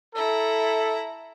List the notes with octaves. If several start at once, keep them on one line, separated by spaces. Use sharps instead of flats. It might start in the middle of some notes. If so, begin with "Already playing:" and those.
E4 A4 A#5